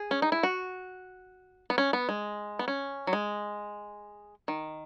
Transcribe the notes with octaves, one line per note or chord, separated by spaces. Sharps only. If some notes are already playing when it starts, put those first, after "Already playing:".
Already playing: G#4
C#4
D#4
E4
F#4
B3
C#4
B3
G#3
B3
C#4
F#3
G#3
D#3